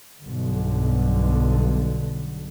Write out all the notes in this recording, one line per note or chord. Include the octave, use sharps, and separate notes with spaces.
B1 G2 D3